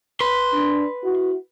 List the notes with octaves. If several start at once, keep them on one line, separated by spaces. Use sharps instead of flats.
B4 C6
D4
E4 F#4